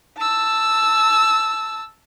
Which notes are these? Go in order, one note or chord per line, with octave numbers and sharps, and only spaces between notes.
A5 E6